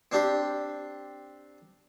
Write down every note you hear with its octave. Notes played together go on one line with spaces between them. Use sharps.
C4 D4 G4 C6